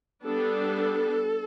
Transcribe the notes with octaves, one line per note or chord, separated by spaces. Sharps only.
G3 B3 D4 A4